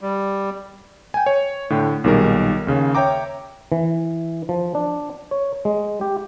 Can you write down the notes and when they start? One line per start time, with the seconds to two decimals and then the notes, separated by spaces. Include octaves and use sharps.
0.01 G3
1.14 G5 G#5
1.26 C#5
1.70 A2 D3 G5
2.04 B1 A#2 D#3 G3 G#4 A#4
2.67 D#2 C#3
2.95 C#5 E5 G5 A#5 D6
3.72 E3
4.49 F3
4.75 D4
5.31 C#5
5.65 G#3
6.01 G4